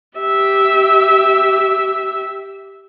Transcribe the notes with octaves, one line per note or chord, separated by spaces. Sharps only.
G4 E5